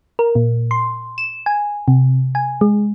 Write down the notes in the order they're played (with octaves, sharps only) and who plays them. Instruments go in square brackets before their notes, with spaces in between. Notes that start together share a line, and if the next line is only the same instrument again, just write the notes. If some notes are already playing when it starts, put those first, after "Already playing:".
[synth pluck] A#4
A#2
C6
E7
G#5
C3
G#5
G#3